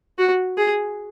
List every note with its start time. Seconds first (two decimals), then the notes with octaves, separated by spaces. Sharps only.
0.18 F#4
0.57 G#4